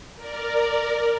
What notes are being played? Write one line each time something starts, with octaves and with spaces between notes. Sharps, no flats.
A#4 D5